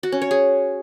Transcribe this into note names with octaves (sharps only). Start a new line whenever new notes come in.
F#4
C#4
C#5
G#4